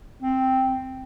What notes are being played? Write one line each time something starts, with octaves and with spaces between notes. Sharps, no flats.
C4